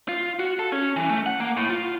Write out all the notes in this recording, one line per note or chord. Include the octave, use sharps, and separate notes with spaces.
F4
F#4
A4
C#4
E3
A3
F#5
A#3
A2
F4